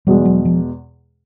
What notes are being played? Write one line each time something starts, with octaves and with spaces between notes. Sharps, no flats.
E2 B2 G3 G#3
F#3
F3